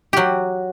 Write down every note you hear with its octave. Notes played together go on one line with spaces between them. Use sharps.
F#3 F#4 G4